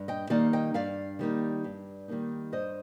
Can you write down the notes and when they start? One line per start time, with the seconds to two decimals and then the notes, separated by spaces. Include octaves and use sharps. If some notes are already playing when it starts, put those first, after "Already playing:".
Already playing: G2
0.08 D#5 G5
0.30 D#3 G3 A#3 D#4 D5 F5
0.53 D#5 G5
0.74 G2 D5 F5
1.19 D#3 G3 A#3 D#4
1.64 G2
2.08 D#3 G3 A#3 D#4
2.52 G2 C5 D#5